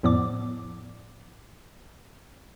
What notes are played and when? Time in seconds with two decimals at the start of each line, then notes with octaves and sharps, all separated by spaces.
0.03 F2 A2 F3 B3 D5 D6